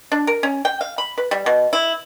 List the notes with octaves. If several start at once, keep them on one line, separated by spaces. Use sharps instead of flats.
D4
A#4
C#4
G5
F5
B5
B4
G3
B2
E4